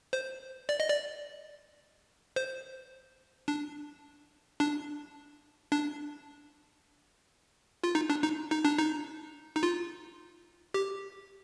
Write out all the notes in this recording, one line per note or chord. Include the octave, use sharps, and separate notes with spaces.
C5
D5
D#5
D5
C5
D4
D4
D4
F4
D#4
D4
D#4
D#4
D4
D#4
D#4
F4
G4